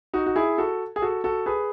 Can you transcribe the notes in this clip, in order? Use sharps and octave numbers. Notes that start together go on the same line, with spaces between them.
D#4 F#4
F#4
E4 G#4
F#4 A4
G#4
F#4 A4
F#4 A4
G#4 B4